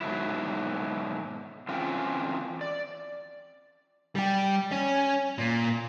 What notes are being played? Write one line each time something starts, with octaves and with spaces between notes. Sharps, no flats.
G#2 B2 D#3 F#3 E4
E3 C4 C#4 F4 F5 G5
D5
G3 G4
C#4
A#2